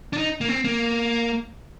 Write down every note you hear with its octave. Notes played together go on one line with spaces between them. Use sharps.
D4
D#4
A#3
C4
A#3